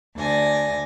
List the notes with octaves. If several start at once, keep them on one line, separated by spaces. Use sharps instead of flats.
D2 D5 G#5 A#6